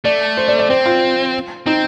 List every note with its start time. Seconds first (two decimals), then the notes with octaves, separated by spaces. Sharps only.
0.05 A3 D5
0.37 C5
0.48 D5
0.59 D5
0.70 C4 C5
0.86 F4
1.66 C4 D#4